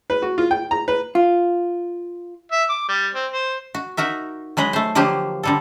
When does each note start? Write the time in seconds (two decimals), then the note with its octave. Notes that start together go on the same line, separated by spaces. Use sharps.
0.10 B4
0.22 F#4
0.38 F4
0.51 G5
0.71 A#5
0.88 B4
1.15 F4
2.52 E5
2.69 D6
2.88 G3
3.14 C4
3.32 C5
3.74 F#4
3.97 D#4 F#4 A#4 E5
4.57 F#3 G#3 B4 D#5
4.73 A3 C5
4.95 D3 F3 F#3 A#3 G4 C5
5.43 D3 G3 A4